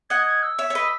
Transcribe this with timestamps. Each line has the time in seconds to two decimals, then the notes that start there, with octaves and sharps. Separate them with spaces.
0.10 D#5 F#5 G#6
0.27 G#6
0.43 E6
0.59 C#5 E5
0.70 C#5
0.75 B4 D#5